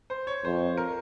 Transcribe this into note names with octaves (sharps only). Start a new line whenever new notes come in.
C5
C#5
F2 C5
A#4